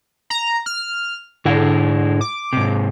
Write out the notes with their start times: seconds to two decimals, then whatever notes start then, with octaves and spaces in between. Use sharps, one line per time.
0.30 A#5
0.66 F6
1.45 G#2 D3 E4
2.21 D6
2.53 G#2 C3